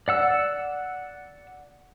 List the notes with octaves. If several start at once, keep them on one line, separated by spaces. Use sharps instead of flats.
D5 F#5 E6